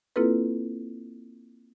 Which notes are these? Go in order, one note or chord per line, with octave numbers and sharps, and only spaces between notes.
A#3 C4 E4 F4 A4 B4